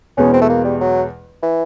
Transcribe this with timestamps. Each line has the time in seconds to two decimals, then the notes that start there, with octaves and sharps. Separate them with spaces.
0.17 E2 B2 G#3 B3 C#4
0.33 C4
0.42 A3
0.50 A#3
0.65 G3
0.81 F#3
1.43 E3